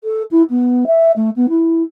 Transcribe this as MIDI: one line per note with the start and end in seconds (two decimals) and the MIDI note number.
0.03 0.22 69
0.31 0.42 64
0.49 0.84 59
0.86 1.11 76
1.16 1.30 57
1.36 1.46 59
1.49 1.82 64